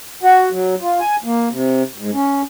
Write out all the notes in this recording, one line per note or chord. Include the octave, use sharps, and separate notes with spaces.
F#4
F#3
F4
G#5
A#3
C3
G#2
C#4